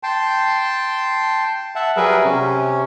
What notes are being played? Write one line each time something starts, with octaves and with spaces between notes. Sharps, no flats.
G5 A5 C6
E5 F#5 A5
F#3 G3 G#4 A#4 B4 E5
C3 C#4